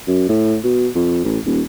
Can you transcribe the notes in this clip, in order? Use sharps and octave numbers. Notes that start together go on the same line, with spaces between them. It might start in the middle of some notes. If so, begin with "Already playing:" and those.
F#2
A2
B2
F2
A1
D#1